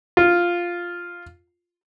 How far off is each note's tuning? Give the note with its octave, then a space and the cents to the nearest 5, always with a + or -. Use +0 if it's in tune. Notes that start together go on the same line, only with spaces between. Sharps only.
F4 +0